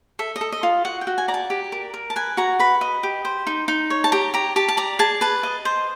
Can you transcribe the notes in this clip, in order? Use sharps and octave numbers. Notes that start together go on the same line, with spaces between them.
A4 E5
D#5
A4
D#5
F4
F#4 F#5
G5
F#4
G#5
D5 A#5
A5
G4
A#4
A#4
A5
B4 G#5
F#4 A#5
B4 B5
D#5
G4
C5
D#4
D#4
C#5
A5
G4 A#5
G4 A#5
G4 A5
A5
D5 A#5
G#4 A5
B4 A5
D#5
C5